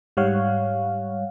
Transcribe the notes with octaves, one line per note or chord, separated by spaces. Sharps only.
G#2 G3 C#5 F5 F#5